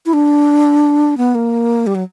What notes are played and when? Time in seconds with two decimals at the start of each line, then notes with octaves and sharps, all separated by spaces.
0.06 E4
0.13 D4
1.17 B3
1.35 A#3
1.87 G3
1.95 F#3